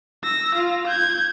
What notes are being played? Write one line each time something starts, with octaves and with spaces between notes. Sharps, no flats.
E6 A#6
F4 F5
G6 G#6